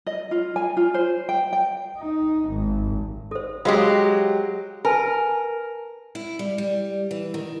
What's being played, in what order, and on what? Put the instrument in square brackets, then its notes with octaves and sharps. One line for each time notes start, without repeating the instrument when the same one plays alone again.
[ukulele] D#5
F4
G#5
F4
C5
G5
G5
[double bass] D#4
G#1
[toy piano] A4 C5
[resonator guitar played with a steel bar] F#3 G#3 G4 [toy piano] C5 F5
[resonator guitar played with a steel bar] A#4 [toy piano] B4 G#5 A5
[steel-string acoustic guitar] E4
G3
G3
E3
D#3